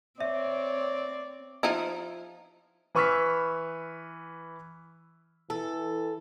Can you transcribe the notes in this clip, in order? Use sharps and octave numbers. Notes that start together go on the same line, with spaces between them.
C4 C#5 D5 E5
F3 D#4 E4
E3 B4 C#6 E6 F6 B6
E3 A4